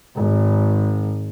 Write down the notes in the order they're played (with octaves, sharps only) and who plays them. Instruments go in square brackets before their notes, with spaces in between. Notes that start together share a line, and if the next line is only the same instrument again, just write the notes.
[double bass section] G#1